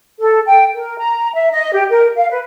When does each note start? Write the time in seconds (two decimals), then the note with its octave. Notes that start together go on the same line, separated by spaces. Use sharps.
0.20 A4
0.45 G5
0.75 A#4
0.98 A#5
1.34 E5
1.51 D#5
1.73 G4
1.90 A#4
2.17 F5
2.30 B4